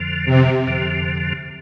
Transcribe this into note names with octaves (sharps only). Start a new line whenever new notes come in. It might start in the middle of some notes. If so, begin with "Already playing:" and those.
Already playing: F2 D3 F3
C3
F2 D3 F3